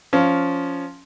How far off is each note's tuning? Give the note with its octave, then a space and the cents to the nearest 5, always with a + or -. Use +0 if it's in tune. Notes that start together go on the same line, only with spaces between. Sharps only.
F3 +0 C#4 +10